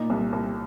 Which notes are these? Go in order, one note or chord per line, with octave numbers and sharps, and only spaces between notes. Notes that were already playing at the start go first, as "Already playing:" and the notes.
Already playing: A#2 D#4
C2
C2